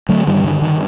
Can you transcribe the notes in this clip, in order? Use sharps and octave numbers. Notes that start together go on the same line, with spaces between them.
D3 F#3 A3
G2 D#3 G3
D3 D#3
G2 D#3